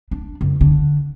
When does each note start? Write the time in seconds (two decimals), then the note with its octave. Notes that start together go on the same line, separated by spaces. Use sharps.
0.11 D4
0.41 F#1
0.61 D3